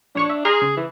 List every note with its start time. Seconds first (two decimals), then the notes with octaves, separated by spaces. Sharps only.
0.15 A#1 D4 C#5 C#6
0.30 E5
0.45 G#4 A#5 C6 F6
0.62 C#3
0.77 E3